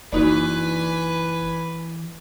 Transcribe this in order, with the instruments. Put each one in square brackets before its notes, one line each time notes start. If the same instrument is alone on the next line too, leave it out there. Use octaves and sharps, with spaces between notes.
[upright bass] F#1 [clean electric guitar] E3 D5 [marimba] A#3 D#4 F#4 [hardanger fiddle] B4 G#5